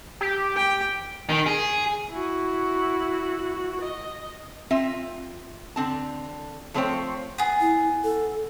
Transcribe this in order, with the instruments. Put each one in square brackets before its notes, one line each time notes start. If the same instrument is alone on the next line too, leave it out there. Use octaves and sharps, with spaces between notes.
[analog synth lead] G4
[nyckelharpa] G5
[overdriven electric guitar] D#3
G#4
[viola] E4 F#4
D#5
[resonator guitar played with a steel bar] C4 F4 E5
D3 C4 A5
F3 A3 C4 C5 C#5 G5
[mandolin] B3 G#4
[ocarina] E4
A4